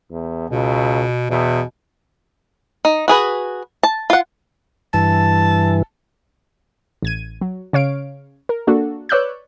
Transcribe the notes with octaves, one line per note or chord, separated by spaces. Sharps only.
E2
C#2 B2
E2 B2
D#4
F#4 G#4 B4
A5
F4 F#5
G2 E3 A5
A1 G#6 D#7
F#3
C#3 C#5 F5 D7
A#4
A#3 D4 F#4 A4
B4 C#5 D5 E6 F#6 G6